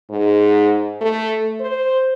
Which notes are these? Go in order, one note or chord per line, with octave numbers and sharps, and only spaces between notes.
G#2
A3
C5